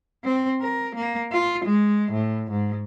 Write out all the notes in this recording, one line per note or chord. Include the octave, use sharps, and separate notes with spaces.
C4
A#4
A#3
F4
G#3
A2
G#2